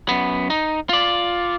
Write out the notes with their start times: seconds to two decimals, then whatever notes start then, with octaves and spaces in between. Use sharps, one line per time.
0.09 F#2 B3
0.50 D#4
0.89 F4 D5